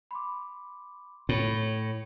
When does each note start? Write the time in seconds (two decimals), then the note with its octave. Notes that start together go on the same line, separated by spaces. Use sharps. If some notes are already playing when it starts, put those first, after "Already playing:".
0.11 B5 C6 D6
1.29 A2 C#5 B5 C#7